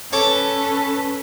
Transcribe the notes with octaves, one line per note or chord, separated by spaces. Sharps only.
C#4 A4 B4 C#5 A5 D6